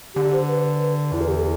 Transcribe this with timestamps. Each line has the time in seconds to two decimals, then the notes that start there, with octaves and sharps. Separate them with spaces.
0.15 D3 G4
0.32 C5
0.48 B4
1.12 E2 E4
1.21 B4
1.28 G4
1.37 A4